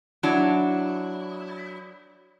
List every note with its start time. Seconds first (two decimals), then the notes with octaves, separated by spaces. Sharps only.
0.23 F#3 D4 E4